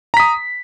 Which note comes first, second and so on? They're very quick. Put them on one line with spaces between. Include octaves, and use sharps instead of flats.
A#5 B6 D#6